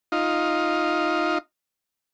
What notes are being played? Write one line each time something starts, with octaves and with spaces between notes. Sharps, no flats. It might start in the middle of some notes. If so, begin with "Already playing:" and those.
D#4 F4